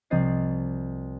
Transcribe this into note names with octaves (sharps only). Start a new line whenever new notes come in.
C2 F3 C4 D#5 A6 C7